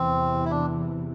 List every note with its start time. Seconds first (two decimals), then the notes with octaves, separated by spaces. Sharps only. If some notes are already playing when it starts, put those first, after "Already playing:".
Already playing: E2 C3 E3 C4
0.45 E4
0.51 D4